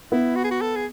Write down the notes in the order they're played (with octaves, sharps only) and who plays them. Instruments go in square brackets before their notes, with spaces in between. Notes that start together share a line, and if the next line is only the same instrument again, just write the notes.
[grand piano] B3 [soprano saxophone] E4
[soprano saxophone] F#4
G#4
F#4
A4
G#4